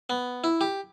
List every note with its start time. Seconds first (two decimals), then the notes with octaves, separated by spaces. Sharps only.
0.10 B3
0.44 E4
0.61 G4